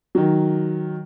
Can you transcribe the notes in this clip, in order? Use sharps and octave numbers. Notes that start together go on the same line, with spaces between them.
D#3 F#3